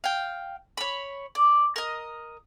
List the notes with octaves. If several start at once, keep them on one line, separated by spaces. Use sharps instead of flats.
F5 G5
C#5 B5
D5
A#4 D#5